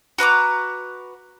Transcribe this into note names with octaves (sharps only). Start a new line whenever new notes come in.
F#4 B4 A#5 D6